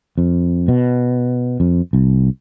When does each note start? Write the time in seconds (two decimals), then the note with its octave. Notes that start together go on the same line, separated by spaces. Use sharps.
0.18 F2
0.68 B2
1.60 F2
1.93 C2